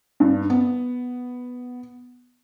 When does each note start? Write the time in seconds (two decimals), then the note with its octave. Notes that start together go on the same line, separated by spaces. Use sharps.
0.20 G2
0.50 B3